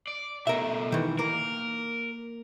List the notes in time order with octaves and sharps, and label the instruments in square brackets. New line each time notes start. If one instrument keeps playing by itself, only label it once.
[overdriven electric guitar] D5
[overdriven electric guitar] B2 A3 [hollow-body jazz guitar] A#4 E5
[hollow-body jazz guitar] D#3 E3
[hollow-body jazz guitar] A#3 [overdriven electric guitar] A#4